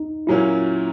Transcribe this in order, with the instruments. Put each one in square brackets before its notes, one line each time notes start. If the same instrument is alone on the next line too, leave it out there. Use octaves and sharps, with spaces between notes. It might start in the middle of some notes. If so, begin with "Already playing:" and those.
Already playing: [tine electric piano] D#4
[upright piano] A#2 F#3 A#3 C#4 [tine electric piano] E4